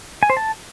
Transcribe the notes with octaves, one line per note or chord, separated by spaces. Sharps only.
G#5
C5
A5